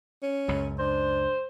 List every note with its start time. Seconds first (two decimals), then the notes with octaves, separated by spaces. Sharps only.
0.23 C#4
0.48 C#2 F#2
0.79 D4 C5